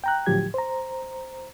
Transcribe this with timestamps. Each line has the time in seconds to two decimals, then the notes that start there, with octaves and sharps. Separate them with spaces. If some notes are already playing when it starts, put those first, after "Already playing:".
0.04 G5 A#5 F#6
0.26 A2 D3 F3 F#3 G4 G#6
0.54 C5 A#5